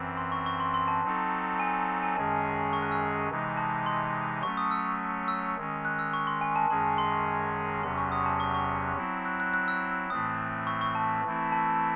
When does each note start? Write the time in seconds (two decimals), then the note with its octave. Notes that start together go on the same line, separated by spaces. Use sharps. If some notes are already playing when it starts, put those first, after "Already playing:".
Already playing: F#2 E3 C4
0.17 C6
0.32 C#6
0.46 C#6
0.60 C6
0.74 C6
0.88 A5
1.03 F#3 C4 D#4 A4
1.59 G#5
2.02 G#5
2.16 F#2 D#3 G#3 C#4 G#4 A5
2.73 C#6
2.82 F#6
2.92 E6
3.30 C3 E3 G#3 D#4
3.57 A5
3.86 C6
4.42 F#3 A3 C#4 C#6
4.57 D#6
4.71 E6
5.28 E6
5.57 D#3 G#3 C#4
5.85 F#6
5.99 E6
6.13 C#6
6.27 C6
6.41 G#5
6.56 A5
6.69 F#2 D#3 G#3 C#4 G#4 A5
6.98 C6
7.83 E2 C3 F#3 C#4 C6
7.98 C#6
8.12 D#6
8.26 A5
8.40 C#6
8.54 C#6
8.82 F#6
8.96 F#3 C4 E4
9.25 F#6
9.40 F#6
9.54 F#6
9.68 E6
10.10 A2 E3 A3 C4 D#6
10.67 C#6
10.81 C#6
10.95 A5
11.24 E3 A3 C4 E4
11.52 A5